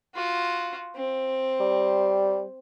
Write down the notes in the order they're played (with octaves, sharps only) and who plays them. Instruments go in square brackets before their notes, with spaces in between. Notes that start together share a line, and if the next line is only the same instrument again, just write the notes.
[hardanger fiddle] F4 F#4
C4
[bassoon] G3